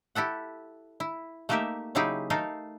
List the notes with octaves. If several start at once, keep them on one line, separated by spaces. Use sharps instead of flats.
E4 G4 A4 F#5
E4
A3 A#3 D#4 G4 A#4 E5
C#3 F#3 D#4 E4 G4 G#4
A3 D#4 A4 A#4 F5